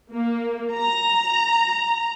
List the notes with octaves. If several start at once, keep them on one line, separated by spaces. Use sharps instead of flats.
A#3
A#5